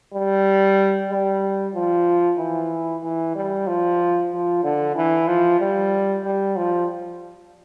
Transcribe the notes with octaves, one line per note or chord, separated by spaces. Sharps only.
G3
G3
F3
E3
E3
G3
F3
F3
D3
E3
F3
G3
G3
F3